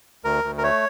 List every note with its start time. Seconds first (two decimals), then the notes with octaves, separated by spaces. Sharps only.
0.24 D2 A#4
0.44 D2
0.58 A#4
0.63 A3 C#5